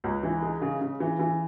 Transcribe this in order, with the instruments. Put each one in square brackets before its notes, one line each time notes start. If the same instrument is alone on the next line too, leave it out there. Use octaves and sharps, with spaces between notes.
[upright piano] C#2
E3
G#3
C#3
C#3
E3
E3